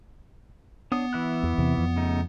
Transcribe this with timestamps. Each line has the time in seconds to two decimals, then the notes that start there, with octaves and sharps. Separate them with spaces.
0.92 B3 D4 C#5 D#6
1.13 E3 E4 F#6
1.43 E2
1.58 E2 C3
1.78 F2
1.96 C#3 A3 D#4